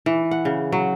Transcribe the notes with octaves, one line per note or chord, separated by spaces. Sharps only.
E3
F#5
C#3
F#3